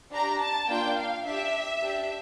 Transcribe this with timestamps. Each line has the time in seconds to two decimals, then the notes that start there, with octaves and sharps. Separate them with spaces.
0.12 D4 G4 A#5
0.41 A5
0.68 A#3 D4 F4 G5
0.96 F5
1.25 D4 G4 E5
1.82 D4 G4